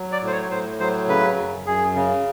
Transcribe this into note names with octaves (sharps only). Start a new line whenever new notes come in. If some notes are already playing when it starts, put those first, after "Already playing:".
Already playing: F#3
D5
A2
C5
C#5
A2 C5
F#3 C5
C#3 B4
F#2
F#2 G#4
C#3